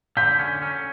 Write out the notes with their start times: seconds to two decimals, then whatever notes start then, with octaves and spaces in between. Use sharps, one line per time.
0.17 D3 G6 B6
0.39 C#4
0.62 C#4